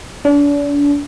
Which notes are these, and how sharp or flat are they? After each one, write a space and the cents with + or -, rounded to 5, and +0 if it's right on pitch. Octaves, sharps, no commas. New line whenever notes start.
D4 -35